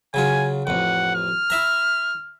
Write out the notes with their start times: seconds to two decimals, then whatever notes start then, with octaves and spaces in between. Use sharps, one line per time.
0.14 C#3 F#3 F4 G#5
0.67 A1 F2 F#5
1.15 F6
1.50 E4 E5 A#5